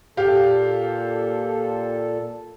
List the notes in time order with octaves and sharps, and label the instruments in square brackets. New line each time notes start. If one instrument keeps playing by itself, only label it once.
[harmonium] A#2 A4 [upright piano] G4 F5